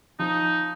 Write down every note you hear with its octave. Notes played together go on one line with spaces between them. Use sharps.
F3 D#4